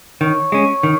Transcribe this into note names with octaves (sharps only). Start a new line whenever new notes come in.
D#3 C#5
G#3 C#4
D#3